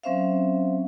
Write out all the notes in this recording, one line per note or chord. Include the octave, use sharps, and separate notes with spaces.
F#3 C4 C#4 C5 E5 F5